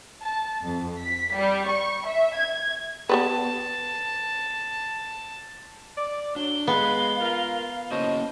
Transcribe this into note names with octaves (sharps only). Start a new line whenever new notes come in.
A5
F2
B6
G3
C#6
E5
G#6
B3 G4 B4 A5
D5 D6
F#3 D4 G7
G#3 B3 F5
F4 A#4
A#3 C#4 F#4 C5 C#5 D#5 A5